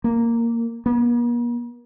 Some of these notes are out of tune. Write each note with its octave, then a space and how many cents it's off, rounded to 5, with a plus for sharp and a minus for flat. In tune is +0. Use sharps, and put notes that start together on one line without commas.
A#3 -5
A#3 +45